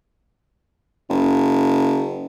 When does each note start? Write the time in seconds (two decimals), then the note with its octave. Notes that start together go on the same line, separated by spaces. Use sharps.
1.10 F#1